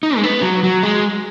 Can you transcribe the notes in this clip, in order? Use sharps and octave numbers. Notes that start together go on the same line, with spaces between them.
D#4
G#3
B3
F#3
F#3
G#3